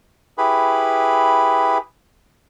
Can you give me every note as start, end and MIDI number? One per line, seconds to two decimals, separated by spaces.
0.38 1.78 64
0.38 1.78 67
0.38 1.78 68
0.38 1.78 71
0.38 1.78 83